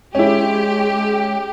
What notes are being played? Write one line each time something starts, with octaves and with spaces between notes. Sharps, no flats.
G#3 C#4 E4 G4